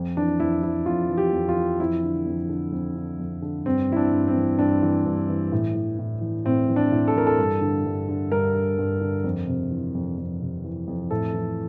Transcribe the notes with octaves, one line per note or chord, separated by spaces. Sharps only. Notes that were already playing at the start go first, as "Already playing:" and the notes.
Already playing: F2
E3 D4
F2 E4
E3 E4
F2 F4
E3
G4
F2
F4
E3
F2 E4
D3
F2
D3
F2
D3
F2
D3
G2 C4
E3 E4
D4
G2
C4
E3
G2 D4
E3
G2
E3
A2
E3
A2
E3
A2 C4
E3
D4
A2
A4
E3 A#4
A4
G2
D3
G2
D3
G2 A#4
D3
G2
D3
F2
C3
E3
F2
F2
C3
E3
F2
A2 A4
E3